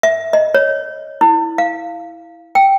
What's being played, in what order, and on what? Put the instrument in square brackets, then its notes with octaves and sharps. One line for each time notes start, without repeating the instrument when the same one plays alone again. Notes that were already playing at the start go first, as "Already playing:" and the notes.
[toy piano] E5
D#5
C#5
E4
F5
G5